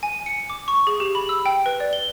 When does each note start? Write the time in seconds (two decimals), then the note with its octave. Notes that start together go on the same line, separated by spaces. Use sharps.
0.03 G#5
0.26 C#7
0.50 D6
0.68 C#6
0.87 G#4
1.00 G4
1.15 B5
1.29 E6
1.46 G5
1.66 B4
1.80 D5
1.93 G7